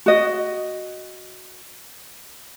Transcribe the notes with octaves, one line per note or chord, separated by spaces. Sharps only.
F#4 D#5